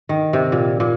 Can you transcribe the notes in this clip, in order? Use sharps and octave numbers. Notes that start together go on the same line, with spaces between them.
D#3
C3
A#2
A#2